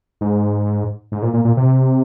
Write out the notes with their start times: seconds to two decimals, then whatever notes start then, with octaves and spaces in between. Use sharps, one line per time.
0.21 G#2
1.12 G#2
1.22 A#2
1.33 A#2
1.45 A#2
1.57 C3